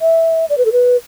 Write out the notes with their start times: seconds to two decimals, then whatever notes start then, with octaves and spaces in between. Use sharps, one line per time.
0.01 E5
0.50 D5
0.58 B4
0.65 A4
0.72 B4